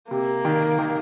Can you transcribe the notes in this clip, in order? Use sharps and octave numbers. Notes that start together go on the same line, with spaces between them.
C3 A#3
D#3
D#3